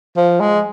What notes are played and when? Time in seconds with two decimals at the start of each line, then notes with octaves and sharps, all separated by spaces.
0.17 F3
0.41 G#3